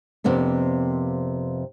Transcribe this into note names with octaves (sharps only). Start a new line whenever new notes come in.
F2 C3 A#3 B3 D4